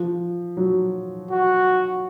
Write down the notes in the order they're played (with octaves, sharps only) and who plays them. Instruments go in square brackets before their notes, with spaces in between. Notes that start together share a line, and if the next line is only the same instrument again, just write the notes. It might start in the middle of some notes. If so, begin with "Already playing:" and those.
Already playing: [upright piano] F3
F#3
[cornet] F#4